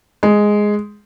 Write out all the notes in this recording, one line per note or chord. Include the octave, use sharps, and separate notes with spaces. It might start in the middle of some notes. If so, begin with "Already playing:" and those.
G#3